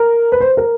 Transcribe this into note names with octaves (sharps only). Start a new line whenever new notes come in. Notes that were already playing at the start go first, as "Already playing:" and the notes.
Already playing: A#4
B4
C5
A#4